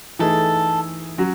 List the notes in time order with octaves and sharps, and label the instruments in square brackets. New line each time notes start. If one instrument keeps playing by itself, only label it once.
[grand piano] E3 A3 D#4 G#4 [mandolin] A4
[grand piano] F#3 C#4 F#4